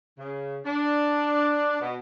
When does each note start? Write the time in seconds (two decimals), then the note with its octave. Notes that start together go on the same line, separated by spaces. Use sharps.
0.18 C#3
0.65 D4
1.81 B2